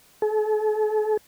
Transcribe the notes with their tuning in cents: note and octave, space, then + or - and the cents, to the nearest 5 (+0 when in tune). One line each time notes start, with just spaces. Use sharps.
A4 -45